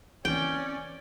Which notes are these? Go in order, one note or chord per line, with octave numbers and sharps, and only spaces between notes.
E3 C4 C#4 D5 G5